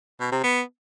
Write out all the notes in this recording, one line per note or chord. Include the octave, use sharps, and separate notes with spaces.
B2
C3
B3